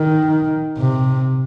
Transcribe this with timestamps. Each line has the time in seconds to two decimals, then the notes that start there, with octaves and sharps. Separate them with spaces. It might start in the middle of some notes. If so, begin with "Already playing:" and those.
Already playing: D#3
0.79 C3